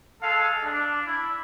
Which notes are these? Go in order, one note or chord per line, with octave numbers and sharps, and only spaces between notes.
G#3 A4 F5
D4
E4